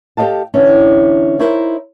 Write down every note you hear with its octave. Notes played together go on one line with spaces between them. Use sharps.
G4 A4 C5 D#5 F5 A5
D3 E3 C#4 D4
D#4 E4 A#4 C5 C#5 E5